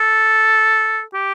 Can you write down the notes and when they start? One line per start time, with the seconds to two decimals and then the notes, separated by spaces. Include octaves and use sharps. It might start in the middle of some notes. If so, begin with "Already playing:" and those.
Already playing: A4
1.14 G4